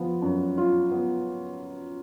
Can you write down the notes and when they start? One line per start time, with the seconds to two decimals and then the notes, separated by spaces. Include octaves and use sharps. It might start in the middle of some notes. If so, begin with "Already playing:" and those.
Already playing: F3 B3 F4
0.22 F#2
0.57 F4
0.91 B3